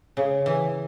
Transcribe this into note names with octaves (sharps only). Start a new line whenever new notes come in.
C#3
E3